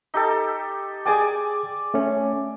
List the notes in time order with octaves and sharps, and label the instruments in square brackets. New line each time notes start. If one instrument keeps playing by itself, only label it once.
[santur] D#4 G4 A4
[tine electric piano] G#4 G5 [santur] D5 G#5 D6
[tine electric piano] A3 C#4